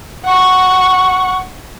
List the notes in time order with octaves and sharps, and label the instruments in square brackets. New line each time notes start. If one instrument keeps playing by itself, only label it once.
[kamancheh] F#5 C#6